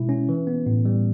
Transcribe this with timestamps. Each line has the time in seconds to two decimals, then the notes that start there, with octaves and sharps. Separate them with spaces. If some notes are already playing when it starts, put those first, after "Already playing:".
Already playing: B2 G#3 E4
0.09 C#4
0.29 E3
0.47 B3
0.66 A2
0.85 G3